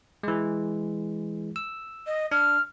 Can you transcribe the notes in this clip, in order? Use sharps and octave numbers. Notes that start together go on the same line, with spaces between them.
E3 G#3
E6
D#5
D4 F6